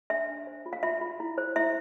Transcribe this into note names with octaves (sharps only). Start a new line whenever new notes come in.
D4 E5
D4
C5
F4
F5
F4 E5
F4
E4
C5
E4 E5